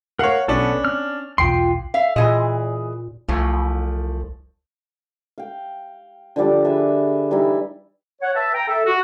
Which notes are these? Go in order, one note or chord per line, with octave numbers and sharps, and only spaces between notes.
A#4 C#5 F5 F#5
B1 B3 C#4 D4 A4
C4 F6
B1 E2 F4 G5 C6 C7
E5 F5
A#2 E3 G#4 D#5
C2 E3 F3 A3
F5 G5
D3 F3 G3 D5
G#4 B4 E5
E3 G3 D#4 E4
C#5 F#5
B4 E5 A5
G5 A#5
A4 E5
F#4